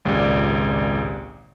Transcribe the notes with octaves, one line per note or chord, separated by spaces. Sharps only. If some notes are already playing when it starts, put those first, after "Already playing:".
G#1 C#2 A#2 G4 D5 D6